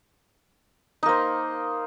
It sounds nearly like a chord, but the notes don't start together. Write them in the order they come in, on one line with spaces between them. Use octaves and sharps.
D#4 A#3 C5